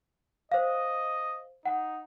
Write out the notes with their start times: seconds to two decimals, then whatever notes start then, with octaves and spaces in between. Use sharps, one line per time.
0.52 C5 D#5 F5
1.66 D#4 F#5